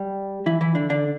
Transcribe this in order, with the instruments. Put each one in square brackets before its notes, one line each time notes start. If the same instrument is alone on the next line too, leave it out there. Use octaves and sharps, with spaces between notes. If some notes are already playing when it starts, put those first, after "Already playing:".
Already playing: [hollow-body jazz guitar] G3 G4
E3 E4
E3 E4
D3 D4
D3 D4